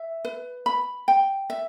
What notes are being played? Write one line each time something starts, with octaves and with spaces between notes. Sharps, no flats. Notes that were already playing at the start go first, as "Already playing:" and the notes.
Already playing: E5
B4
B5
G5
E5